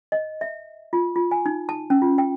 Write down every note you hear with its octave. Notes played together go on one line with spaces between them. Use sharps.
D#5
E5
F4
F4
G#5
D#4
A5
C#4
F4
G5